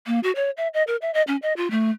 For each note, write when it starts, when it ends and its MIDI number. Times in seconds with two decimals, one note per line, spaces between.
0.07 0.20 58
0.23 0.32 66
0.36 0.50 73
0.57 0.68 76
0.74 0.83 75
0.87 0.96 70
1.02 1.11 76
1.14 1.22 75
1.27 1.36 61
1.42 1.53 75
1.57 1.70 65
1.71 1.91 57